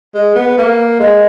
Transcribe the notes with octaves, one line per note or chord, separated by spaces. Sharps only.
G#3
B3
A#3
G#3